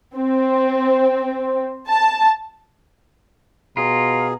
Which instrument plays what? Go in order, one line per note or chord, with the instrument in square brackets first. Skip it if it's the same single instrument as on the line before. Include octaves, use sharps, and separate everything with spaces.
[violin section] C4
A5
[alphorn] B2 [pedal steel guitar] F4 [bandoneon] G#4 [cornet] A#5